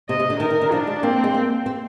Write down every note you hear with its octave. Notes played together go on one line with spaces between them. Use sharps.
C3 D#5
C3
D3
D#3 A#4
D#3
D3
F3 D4
G#3
A#3 C4
G#3
A#3
C4